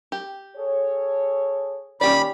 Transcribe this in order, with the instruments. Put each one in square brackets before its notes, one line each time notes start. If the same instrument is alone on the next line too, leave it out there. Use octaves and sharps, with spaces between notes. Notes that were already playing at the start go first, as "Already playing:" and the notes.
[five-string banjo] G4
[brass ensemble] G#4 A4 C#5
[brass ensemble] D#2 A#2 [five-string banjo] C#4 G4 D5 [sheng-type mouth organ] B5